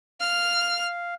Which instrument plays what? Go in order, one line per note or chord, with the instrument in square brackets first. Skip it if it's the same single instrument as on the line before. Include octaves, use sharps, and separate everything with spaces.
[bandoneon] F5 [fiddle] F6